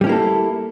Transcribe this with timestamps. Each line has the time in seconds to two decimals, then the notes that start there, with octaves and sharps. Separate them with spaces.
0.01 G3
0.04 C#4
0.07 E4
0.09 A#3
0.12 A4